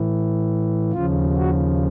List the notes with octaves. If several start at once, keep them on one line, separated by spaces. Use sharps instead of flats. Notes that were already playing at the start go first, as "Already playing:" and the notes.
Already playing: A2 E3
D#2 C#3 F3 F4
F#4